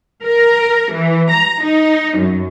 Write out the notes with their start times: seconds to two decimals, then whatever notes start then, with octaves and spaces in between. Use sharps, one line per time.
0.24 A#4
0.91 E3
1.30 A#5
1.63 D#4
2.18 F#2